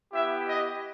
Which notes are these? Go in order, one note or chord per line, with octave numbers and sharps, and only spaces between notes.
B3 E4 G4 E5
D#5